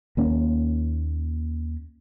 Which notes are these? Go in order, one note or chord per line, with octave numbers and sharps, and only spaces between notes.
D#2 A#3 C#4